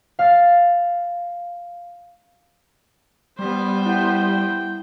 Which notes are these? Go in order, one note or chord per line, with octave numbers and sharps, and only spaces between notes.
F5 F6 A6 C7
G3 B3 C5
E4 F#5 G5